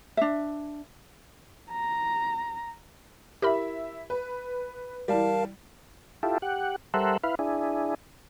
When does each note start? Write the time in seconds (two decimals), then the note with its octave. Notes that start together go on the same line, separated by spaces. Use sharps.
0.17 D4 E5
1.72 A#5
3.42 E4 G4 A#4 E5 B5
4.10 B4
5.08 E3 G3 A#4 F5 A5
6.23 E4 F4 G4 A4
6.42 G4 F#5
6.94 G3 A4 A#4 C5 E5 F#5
7.24 E4 B4 F5
7.39 D4 E4 G#4